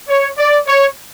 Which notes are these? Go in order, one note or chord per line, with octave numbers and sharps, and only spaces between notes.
C#5
D5
C#5